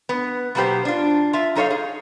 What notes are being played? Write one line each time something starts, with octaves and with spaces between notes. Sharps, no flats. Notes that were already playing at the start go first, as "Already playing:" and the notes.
B3
B2 F#3 A#3 B3 G4 C5
D4 F4
F4 E5
F#2 D#4 A4 C#5 D#5 F5
G#4